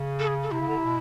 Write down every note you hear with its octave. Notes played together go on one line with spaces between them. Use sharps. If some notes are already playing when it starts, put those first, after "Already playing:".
Already playing: C#3
A4
G#4
A4
C3 E4
C#3
D3
C3
B2